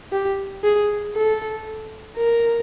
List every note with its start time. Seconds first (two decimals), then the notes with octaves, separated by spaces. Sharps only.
0.12 G4
0.64 G#4
1.15 A4
2.17 A#4